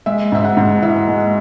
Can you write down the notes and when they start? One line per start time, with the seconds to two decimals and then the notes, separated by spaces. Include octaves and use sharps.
0.06 G#3 E5
0.32 G#2 E5
0.44 F#5
0.57 G#2
0.82 E3 E5
1.08 G#3